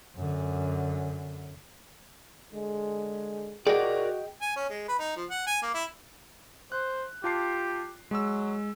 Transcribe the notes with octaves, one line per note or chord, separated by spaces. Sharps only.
F#2 D3
D3 G#3
F#4 G#4 A#4 D5 D#5 G5
G#5
C#4
G#3
B4
D#4
F3
F#5
G#5
A#3
E4
C5 F#6
F4 G4 A5 C7
F#3 G#3 E6